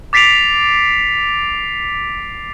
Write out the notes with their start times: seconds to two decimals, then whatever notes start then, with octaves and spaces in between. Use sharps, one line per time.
0.13 D6 A6 B6 C7 D7 F7